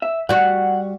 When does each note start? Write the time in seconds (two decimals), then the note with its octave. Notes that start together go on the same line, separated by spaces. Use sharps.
0.02 E5
0.29 G3 F#4 F#5